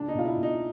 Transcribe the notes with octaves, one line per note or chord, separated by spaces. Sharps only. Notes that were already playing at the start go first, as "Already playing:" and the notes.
Already playing: C#2 D4
D#4
B2 F4
E4
B2
D#4